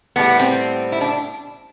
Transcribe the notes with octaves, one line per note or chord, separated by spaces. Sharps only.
A2 G3 B3
C4
E4
D4